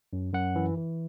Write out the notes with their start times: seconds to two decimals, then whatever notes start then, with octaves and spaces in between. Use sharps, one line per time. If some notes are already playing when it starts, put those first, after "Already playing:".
0.13 F#2
0.33 F#2 F#5
0.55 E3
0.78 E3